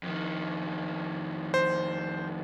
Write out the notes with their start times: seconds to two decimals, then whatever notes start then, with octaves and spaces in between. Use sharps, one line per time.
0.03 F2 D#3
1.54 C5